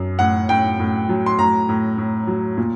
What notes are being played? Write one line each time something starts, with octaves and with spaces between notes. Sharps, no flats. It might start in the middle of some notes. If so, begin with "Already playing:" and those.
Already playing: F#2
A2 F#5
A2 G5
A2
F#3
C6
A2 A#5
A2
A2
F#3
A#2